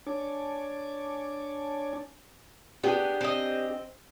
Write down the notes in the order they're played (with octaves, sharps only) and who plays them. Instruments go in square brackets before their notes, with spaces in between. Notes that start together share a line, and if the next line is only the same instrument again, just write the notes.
[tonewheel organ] D4 C#5 G#5 A5 D6
[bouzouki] B3 [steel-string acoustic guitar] D4 G4 G#4
[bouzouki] C4 D#5